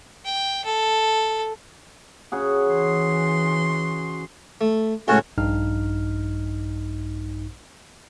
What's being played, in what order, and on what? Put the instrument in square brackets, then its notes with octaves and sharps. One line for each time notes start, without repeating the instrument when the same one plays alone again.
[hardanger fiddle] G5
A4
[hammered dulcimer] C#3 F#4 G#4
[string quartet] E3 C6
[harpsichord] A3
[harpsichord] C#2 A2 A5 [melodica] C#4 F#4
[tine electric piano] A#1 G2 D#4 F6